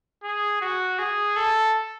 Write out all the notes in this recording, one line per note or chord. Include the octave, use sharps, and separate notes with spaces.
G#4
F#4
G#4
A4